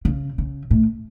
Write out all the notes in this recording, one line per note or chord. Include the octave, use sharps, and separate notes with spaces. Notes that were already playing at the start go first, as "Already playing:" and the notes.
C#3
C#3
A2